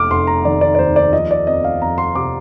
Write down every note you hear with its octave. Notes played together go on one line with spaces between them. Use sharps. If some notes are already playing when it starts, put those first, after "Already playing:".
Already playing: F1 D6 F6
F1 C6
A#5
D#3 D5
D5
D5
D#2 C5
D5
F3 D#5
D5
F2 D#5
F5
F2 A#5
C6
C3 D6